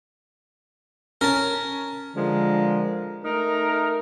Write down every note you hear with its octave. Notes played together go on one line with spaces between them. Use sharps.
C#4 A#4 A5
D3 F3 G#3 A#4
A3 D#4 A#4